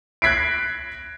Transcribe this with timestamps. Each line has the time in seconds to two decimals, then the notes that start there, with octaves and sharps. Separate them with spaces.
0.22 F#6 G#6 B6 C7 D7